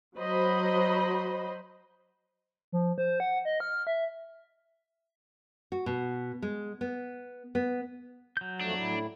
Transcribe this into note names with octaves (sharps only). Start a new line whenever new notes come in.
F#3 C5 D#5 B5
F3
C5
F#5
D#5
F6
E5
F#4
B2
G#3
B3
B3
F#3 G6
E2 F3 A3 D4
A2 E4